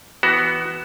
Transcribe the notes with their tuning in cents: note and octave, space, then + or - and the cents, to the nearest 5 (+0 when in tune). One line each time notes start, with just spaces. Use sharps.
E3 +0 B3 +0 F#4 +20